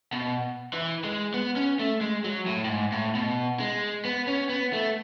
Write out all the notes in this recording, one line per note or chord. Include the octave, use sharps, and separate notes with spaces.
B2
E3
G#3
B3
C#4
A3
G#3
F#3
A2
A2
G#2
A2
B2
G#3
B3
C#4
B3
A3